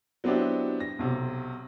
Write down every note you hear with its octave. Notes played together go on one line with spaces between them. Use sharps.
F#3 B3 C4 D4 E4 G4
A#6
B1 C3